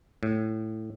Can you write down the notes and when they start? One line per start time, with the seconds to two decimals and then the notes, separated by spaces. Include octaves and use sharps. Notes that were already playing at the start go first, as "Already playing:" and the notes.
0.23 A2